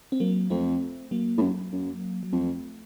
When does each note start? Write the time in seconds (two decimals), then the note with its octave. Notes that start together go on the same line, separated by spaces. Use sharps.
0.12 C4
0.20 F#3 A#3
0.50 F2 A3 C4
1.11 F#3 A#3
1.38 A2
1.42 F#2
1.73 F#2
2.23 F#3
2.33 F2 A3